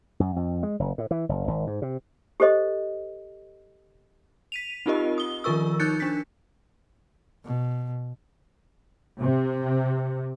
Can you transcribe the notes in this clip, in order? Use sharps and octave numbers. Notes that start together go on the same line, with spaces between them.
F#2
F2
G#3
F#1
A2
E3
F#1
G#1
G#2
C3
G4 A4 C5 D#5
B6 D#7 F7
C4 D#4 F4 G4 A#4 D#5
D#6 G7
D#3 F3 F4 A#4 C#6 E6
D#4 F#6 G6 A6 C#7
D4 B6
B2
C3